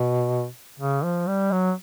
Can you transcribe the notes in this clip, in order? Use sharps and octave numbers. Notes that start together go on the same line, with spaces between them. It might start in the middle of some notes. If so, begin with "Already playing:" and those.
Already playing: B2
C#3
F3
G3
F#3